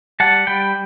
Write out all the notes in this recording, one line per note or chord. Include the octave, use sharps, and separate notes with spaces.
G3 F#5 A5
G3 G5 B5